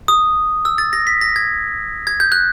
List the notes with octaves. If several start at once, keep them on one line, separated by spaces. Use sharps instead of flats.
D#6
E6
A6
A#6
B6
A#6
G#6
G#6
G6
F#6